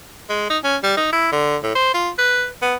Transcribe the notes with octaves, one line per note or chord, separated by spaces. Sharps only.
G#3
D#4
C#4
G3
D#4
E4
D3
A2
C5
F4
B4
B3